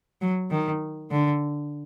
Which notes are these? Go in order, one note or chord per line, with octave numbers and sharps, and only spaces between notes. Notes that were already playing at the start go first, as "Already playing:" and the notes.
F#3
D#3
D3